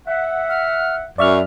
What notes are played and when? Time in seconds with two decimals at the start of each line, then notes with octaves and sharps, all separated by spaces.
0.06 E5 F#5
0.49 F6
1.18 F#2 D5 E5 C#6 F6